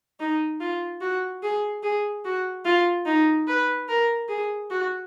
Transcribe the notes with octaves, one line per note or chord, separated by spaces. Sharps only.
D#4
F4
F#4
G#4
G#4
F#4
F4
D#4
B4
A#4
G#4
F#4